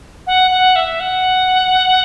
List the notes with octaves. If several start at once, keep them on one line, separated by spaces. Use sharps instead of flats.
F#5
F#5
E5
F#5